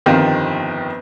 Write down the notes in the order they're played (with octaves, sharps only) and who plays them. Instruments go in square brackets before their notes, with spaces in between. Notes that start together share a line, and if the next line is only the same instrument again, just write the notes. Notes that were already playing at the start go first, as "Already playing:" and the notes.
[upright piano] G1 F2 D#3 F3 G4